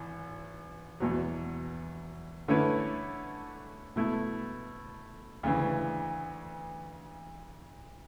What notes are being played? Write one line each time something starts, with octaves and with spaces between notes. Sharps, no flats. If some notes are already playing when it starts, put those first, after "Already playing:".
Already playing: G#1 E3
E2 B2 F#3
D3 A3 C#4 E4 B4
B2 A3 E4
D2 C#3 E3